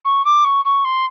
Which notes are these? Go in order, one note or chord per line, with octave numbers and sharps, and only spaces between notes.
C#6
D6
C#6
C#6
C6